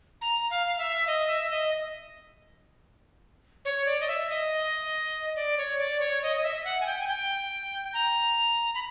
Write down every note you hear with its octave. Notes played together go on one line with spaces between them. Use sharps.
A#5
F5
E5
D#5
E5
D#5
C#5
D5
D#5
E5
D#5
D5
C#5
D5
C#5
D#5
D#5
E5
F#5
G#5
G5
G#5
G5
A#5
B5